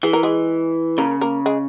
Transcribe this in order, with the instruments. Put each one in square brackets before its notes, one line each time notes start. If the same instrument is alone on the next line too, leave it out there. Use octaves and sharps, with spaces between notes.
[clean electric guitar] E3 [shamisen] G#4
[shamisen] A#4
G#3 G#4
[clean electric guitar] C#3 [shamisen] A#3 A#4
[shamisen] A#3 A#4
G#3 G#4